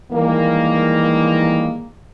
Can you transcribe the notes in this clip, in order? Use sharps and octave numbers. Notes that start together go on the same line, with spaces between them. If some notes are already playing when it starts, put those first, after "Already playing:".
D#3 E3 G3 G#3 A#3